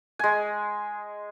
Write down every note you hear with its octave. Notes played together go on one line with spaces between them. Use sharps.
G#3 G#5